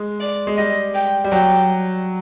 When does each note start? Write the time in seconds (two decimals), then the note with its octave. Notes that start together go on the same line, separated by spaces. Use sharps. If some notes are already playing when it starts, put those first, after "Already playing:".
Already playing: G#3
0.20 D5
0.47 G#3
0.57 G3 D#5
0.95 G5
1.24 G3
1.32 F#3 G5